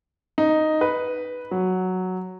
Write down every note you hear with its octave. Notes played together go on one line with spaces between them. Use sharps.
D#4
B4
F#3